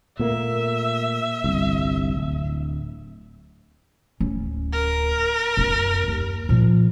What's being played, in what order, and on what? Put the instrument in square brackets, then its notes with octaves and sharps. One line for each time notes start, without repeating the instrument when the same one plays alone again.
[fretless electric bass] A#2 A3 A#3 [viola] E5
[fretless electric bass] G1 C2
D1
[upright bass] D1 C#4
[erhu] A#4
[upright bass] F#2 B3
D#2
A#2 F3